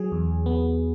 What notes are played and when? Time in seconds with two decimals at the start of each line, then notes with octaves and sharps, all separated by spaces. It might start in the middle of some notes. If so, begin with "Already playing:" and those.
Already playing: F#3 G#4
0.12 E2
0.46 B3